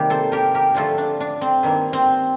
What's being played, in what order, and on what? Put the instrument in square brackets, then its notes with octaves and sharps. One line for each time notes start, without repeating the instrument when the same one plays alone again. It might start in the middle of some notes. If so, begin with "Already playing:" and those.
Already playing: [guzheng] C3 D#3 G3 A#3 G4
A4 C5
G4 A#4
G4 A#4
D3 F3 A3 C4 F4 A4
D4
D4
C4
G2 D#3 A#3
C4